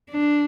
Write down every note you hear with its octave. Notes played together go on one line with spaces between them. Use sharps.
D4